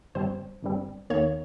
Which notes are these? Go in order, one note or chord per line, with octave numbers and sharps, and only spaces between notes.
G1 G2 G3 C4 C5
G1 G2 G3 C4
D#2 D#3 A#3 C#5